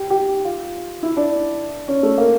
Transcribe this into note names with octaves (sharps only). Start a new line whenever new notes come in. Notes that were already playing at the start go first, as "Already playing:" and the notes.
Already playing: G4
G4
F4
E4
D4
C#4
A3
A#3